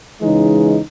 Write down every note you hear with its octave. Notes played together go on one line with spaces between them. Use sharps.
C#2 C#3 E3 G#3 D#4